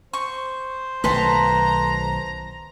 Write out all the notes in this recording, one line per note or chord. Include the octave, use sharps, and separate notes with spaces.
C5 C#6
B1 D#3 A3 B4 A5 A#5 C6